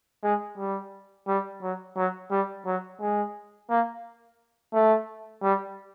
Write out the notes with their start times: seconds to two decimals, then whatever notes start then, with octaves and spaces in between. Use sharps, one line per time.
0.23 G#3
0.58 G3
1.27 G3
1.62 F#3
1.96 F#3
2.30 G3
2.66 F#3
3.01 G#3
3.69 A#3
4.73 A3
5.43 G3